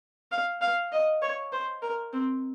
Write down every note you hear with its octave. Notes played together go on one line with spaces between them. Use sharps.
F5
F5
D#5
C#5
C5
A#4
C4